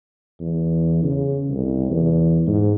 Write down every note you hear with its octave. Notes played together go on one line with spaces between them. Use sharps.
E2
C#3
C2
E2
G#2